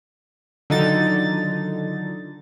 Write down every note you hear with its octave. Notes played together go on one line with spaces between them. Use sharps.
D3 D#3 F#3 D#4 F4 A6